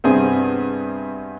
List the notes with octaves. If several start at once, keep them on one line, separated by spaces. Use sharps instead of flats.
G2 C3 B3 C4 G#4 G#5